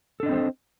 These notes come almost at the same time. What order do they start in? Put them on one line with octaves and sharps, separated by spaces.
A4 D4 D#5 C4 C5